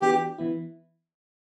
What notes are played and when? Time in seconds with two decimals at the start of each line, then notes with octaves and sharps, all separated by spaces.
0.02 E3 B3 D4 F#4 G4
0.38 E3 B3 E4